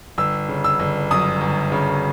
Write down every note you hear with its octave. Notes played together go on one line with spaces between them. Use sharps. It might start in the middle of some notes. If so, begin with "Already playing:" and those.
G1 E6
C#3
E6
G1
F#2 D#6
G1
C#3